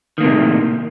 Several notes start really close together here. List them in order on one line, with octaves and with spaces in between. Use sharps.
D#3 A#3 C3 A2